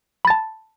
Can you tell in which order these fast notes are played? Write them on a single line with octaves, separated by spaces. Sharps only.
B5 A6 A5